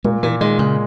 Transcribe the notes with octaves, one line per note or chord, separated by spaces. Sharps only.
A#2 G#3
A#2 E3
D#3 G#3
C#3 G#3